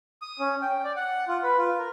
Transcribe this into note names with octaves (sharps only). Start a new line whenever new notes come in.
D#6
C#4
G5
D5
F#5
F4
B4
F4
A#4